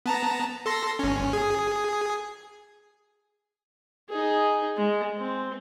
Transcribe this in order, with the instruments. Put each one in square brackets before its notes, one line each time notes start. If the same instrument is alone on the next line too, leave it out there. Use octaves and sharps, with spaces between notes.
[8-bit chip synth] B3 A5 A#5
A4 C6 A#6
G1 C#4
G#4
[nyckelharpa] D#4 G#4
G#3
C4